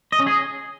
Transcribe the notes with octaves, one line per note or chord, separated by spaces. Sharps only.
D#5
C#4
G#4